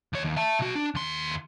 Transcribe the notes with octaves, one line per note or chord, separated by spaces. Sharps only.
D#2 C#5
D#2
E5 A5
B1 F#4
D4
D#2 C6